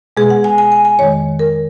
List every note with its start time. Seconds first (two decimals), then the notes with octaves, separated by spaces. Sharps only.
0.17 B2 G#3 B3 G#4
0.30 F#5
0.44 G#5
0.58 G#5
0.72 G#5
0.85 G#5
0.99 F2 D#3 G#3 C#5
1.39 A#4